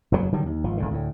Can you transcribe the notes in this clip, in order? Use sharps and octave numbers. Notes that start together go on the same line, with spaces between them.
F#1 E2 A#2 F#3
D3 D#3 F#3 G3
D#2
G#1 F3
G#1 G#2 D3
D2 A2